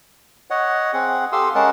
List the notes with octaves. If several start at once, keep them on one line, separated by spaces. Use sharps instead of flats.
C#5 D#5 F#5
C4 G#4 F#5
G4 A4 F5 C6 D#6 E6
G#3 C#4 G#4 A#4 F#5 A5